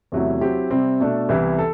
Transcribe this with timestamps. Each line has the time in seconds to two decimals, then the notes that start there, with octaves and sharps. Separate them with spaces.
0.12 E2 C3 F#3 A3 E4
0.41 F#3 C4 E4 G4
0.71 C3 G3 C4
1.00 B2 A3 D4 A4
1.29 C2 C3 E3 B3 E4
1.59 A4